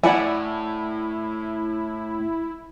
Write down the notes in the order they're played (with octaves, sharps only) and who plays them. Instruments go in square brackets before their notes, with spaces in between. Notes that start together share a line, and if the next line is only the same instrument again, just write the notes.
[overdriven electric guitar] A2 [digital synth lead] E4 [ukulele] D5 F#5 G#5